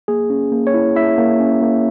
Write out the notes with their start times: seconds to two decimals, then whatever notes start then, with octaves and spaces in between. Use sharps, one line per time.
0.08 A#3 G#4
0.30 C#4
0.52 A#3
0.67 C#5
0.74 E4
0.96 E4 E5
1.18 A#3
1.40 C#4
1.62 A#3